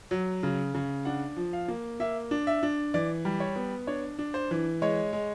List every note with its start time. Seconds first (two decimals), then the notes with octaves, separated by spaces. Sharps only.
0.11 F#3
0.43 C#3
0.74 C#3
1.05 D4 F#5
1.36 F3
1.53 F5
1.68 A#3
2.00 A#3 E5
2.31 D4
2.47 E5
2.63 D4
2.94 E3 D5
3.25 G3
3.40 C#5
3.56 B3
3.87 D4 C#5
4.19 D4
4.34 C5
4.51 E3
4.82 G#3 C#5
5.13 G#3